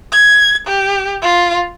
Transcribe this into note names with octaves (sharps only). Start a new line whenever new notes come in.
G#6
G4
F4